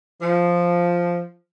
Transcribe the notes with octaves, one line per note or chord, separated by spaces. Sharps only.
F3